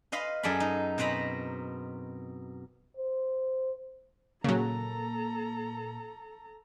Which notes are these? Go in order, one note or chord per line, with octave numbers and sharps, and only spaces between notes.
B4 D#5 F5 B5 C6
F#2 G#4 A4 D5 B5
D#4
B2 C4 B4 A#5 B5
C5
A#2 C#3 F#3 A#3 A4 A#5